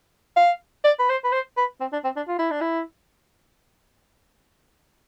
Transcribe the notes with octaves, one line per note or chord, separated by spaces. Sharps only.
F5
D5
B4
C5
B4
C5
B4
C4
D4
C4
D4
F4
E4
D4
E4